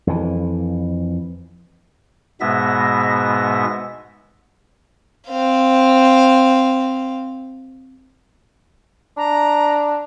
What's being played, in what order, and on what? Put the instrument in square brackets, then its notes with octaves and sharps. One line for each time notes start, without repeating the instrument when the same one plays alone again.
[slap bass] F2 E3
[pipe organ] G#2 B2 G#3 B3 E5 A#6
[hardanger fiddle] C4 F5
[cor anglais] D4 [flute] A#5